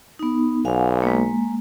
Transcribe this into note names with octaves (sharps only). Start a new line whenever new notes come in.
B3 D#4
B1 F5 F#5 G#5
G#3 A#3